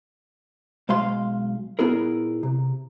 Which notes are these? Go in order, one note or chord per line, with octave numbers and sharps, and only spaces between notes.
B1 G#3 F5 C6
A#2 B3 E4 G#4 A#4
C3